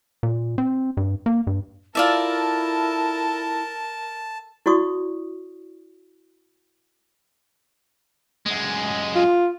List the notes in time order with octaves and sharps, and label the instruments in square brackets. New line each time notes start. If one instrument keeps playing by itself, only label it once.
[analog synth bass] A#2
C4
G2
A#3
G2
[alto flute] E4 [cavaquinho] F4 D5 E5 [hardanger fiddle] A4 A#4 [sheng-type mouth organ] A5
[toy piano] E4 F#4 D5 C#6 D#6
[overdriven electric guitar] F#2 G#3
[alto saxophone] F4